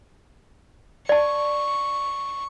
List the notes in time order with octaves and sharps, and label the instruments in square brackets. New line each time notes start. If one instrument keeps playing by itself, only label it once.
[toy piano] D5 A5 [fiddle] C#6